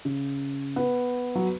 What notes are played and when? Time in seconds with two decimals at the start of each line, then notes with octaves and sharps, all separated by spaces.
0.05 C#3
0.76 B3
1.35 F#3